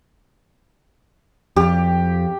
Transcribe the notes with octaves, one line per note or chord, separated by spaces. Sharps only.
F2 G4